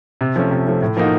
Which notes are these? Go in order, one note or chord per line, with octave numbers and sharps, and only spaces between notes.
C3
F3 A3 C#4
C3
F3 A3 C#4
A2
F3 A#3 D#4 F#4